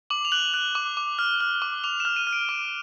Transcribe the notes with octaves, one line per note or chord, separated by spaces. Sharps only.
D6 F#7
F7
F#6 F#7
F#6
D6
D6
F6
F6
D6
D6 F7
E7
F6
D#7
F6
D7
D6 D#7